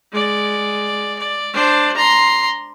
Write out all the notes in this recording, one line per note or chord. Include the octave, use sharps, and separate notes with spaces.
G#3 D5
D5
D4 C5
A#5 C6